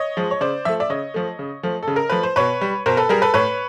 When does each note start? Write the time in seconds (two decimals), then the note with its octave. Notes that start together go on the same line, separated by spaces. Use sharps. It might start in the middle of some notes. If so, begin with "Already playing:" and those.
Already playing: C#5 D#5
0.17 F3 G#3
0.31 C#5
0.41 C#3 C5 D5
0.65 F3 A3 E5
0.80 D5 E5
0.90 C#3 C#5 D#5
1.14 F3 A3
1.39 C#3
1.63 F3 A3
1.83 C#3 A4
1.96 A#4
2.09 F3 A3 B4
2.23 C5
2.36 B2 B4 C#5
2.61 G3
2.86 B2 A#4 C5
2.97 A4 B4
3.09 G3 G#4 A#4
3.22 A4 B4
3.34 A2 B4 C#5